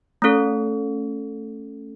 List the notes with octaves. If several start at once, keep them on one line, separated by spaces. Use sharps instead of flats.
A3 C#4 A4